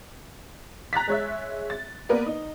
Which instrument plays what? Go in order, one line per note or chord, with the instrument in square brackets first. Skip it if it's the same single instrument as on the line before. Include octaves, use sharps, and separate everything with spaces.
[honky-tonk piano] A#5 F#6 A6 B6
G#3 C#5 E5
A6
A#3 B3 A#4 B4 D5
D#4